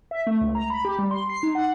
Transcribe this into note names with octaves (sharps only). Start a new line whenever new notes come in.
E5
A3
C#2
A#5
B5
G4
G3
C6
C7
D#4
F#5